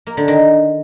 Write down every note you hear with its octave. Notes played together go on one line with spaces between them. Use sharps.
A#3
D3
D#3